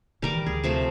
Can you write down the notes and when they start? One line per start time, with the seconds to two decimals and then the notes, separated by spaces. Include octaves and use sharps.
0.22 D#3 E3 G3 A#4 D6
0.46 D2 G#4
0.64 C3 F3 A3